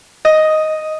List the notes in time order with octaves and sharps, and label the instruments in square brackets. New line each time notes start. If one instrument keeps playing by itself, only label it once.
[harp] D#5